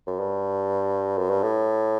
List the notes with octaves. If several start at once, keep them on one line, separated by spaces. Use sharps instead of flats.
F#2
G2
F#2
G2
A2